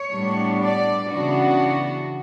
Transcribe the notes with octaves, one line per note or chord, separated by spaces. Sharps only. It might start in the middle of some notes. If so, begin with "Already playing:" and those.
Already playing: C#5
A2 G3 B3 D4
D5
C#3 E3 B3 D4 F#4